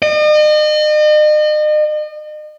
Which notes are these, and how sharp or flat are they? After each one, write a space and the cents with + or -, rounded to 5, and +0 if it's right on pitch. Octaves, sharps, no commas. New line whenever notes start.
D#5 -40